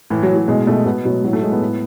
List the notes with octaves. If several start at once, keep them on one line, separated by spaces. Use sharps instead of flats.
A2 E3
F#3
A2
F#3
B2 G#3
B2 A3
B2 B3
B2 F#3
A2 F#3
A3
A2 G#3
B3
A2